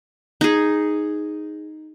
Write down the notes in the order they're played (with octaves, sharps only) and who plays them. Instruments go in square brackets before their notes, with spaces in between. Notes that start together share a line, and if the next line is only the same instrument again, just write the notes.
[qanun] D#4 G#4